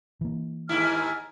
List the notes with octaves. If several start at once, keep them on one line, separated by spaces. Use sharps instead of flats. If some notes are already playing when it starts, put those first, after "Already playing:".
E3 A#3
D#2 G#2 E4 F6